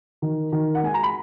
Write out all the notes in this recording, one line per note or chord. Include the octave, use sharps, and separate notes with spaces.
D#3
D#3
F#5
G#3 G#5
A#5
B5